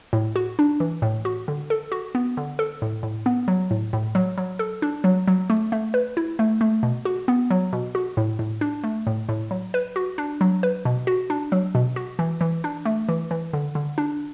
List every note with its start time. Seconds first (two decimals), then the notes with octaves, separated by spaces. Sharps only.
0.13 A2
0.36 F#4
0.59 D4
0.80 E3
1.02 A2
1.25 F#4
1.48 D3
1.70 A4
1.92 F#4
2.15 B3
2.37 D3
2.59 A4
2.82 A2
3.03 A2
3.26 B3
3.48 F#3
3.71 A2
3.93 A2
4.15 F#3
4.38 F#3
4.59 A4
4.82 D4
5.04 F#3
5.28 F#3
5.50 A3
5.72 A3
5.94 B4
6.17 E4
6.39 A3
6.61 A3
6.83 B2
7.05 F#4
7.28 B3
7.51 F#3
7.73 B2
7.95 F#4
8.17 A2
8.39 A2
8.61 D4
8.84 A3
9.07 A2
9.29 A2
9.51 F#3
9.74 B4
9.96 F#4
10.18 D4
10.41 F#3
10.63 B4
10.85 B2
11.07 F#4
11.30 D4
11.52 F#3
11.75 B2
11.96 F#4
12.19 E3
12.41 E3
12.64 D4
12.86 A3
13.09 E3
13.31 E3
13.53 D3
13.75 D3
13.98 D4